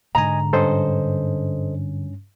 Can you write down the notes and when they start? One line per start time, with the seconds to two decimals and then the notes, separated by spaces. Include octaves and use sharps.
0.15 G#2 D3 D#5 G#5 A#5
0.53 G2 C#4 A4 C5 D#5